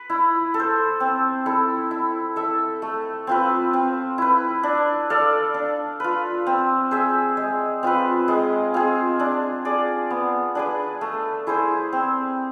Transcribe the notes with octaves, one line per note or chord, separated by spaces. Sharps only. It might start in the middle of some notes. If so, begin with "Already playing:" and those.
Already playing: B4
E4
A4
C5
C4
E4 A4
E4
A4 E5
A3
C4 F4 B4
C4
E4 B4
D4
A4 D5 F5
D4
F4 B4
C4
G#4 C5 E5
G#3
C4 F4 B4
G#3
C4 F4 G#4
D4
G#4 D5
B3
D4 G#4 B4
A3
E4 G#4 C5
C4